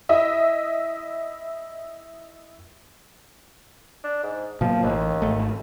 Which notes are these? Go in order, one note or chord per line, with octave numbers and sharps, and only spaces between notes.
E4 D#5 E5
D4
G#2
B2 F3 F#3 A#3
A1 D#2
G#1 A3